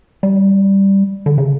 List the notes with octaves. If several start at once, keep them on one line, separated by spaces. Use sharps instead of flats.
G3
D3
C#3